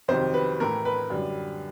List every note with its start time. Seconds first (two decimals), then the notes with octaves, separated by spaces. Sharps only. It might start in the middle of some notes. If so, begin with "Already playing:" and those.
0.08 F2 C3 D#3 F#3 C5
0.34 B4
0.60 A2 E3 A3 A#4
0.85 B4
1.10 F#2 D3 G3